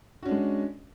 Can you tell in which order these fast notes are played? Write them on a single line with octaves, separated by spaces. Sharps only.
F#4 C#4 D4 G#3